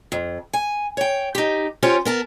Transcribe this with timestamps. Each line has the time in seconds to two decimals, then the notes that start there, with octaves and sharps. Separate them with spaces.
0.12 F2
0.53 G#5
0.97 C#5 G5
1.35 D#4 G4
1.83 C#4 F4 G4 C5 C#5
2.05 B3 A#4 A5